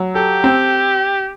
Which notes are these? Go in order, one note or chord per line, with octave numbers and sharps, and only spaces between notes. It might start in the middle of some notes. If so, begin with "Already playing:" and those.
Already playing: F#3
G4 A4
C4